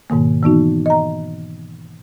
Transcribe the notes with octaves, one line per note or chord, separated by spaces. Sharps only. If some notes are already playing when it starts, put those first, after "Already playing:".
G#2 B2 D#3 A#3
E3 B3 D#4 F#4
D#5 A#5